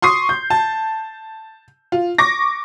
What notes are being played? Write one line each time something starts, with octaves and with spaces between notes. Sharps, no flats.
C6 C#6 D#6 C7
G6
A5
F4
C#6 D6 A#6